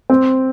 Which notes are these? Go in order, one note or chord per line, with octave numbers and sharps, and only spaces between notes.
C4